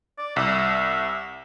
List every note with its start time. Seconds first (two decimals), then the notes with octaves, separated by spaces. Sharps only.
0.18 D5
0.36 C2 E5